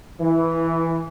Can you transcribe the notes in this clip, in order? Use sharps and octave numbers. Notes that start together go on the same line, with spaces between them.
E3